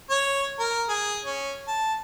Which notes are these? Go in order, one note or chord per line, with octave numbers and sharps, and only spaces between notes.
C#5
A#4
G#4
C#4
A5